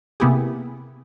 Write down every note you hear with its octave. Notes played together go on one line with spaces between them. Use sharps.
C3 A#3 B3 E4 G4 G#4